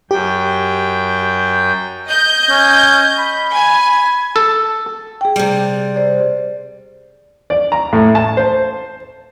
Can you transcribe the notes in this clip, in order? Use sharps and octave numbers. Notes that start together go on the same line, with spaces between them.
F#2 G4 G5
D#5 G6
C#4
B5
G#5
A4
G#4 G5
C3 G3
C5 D5
D5
A#5
A2
A5
C5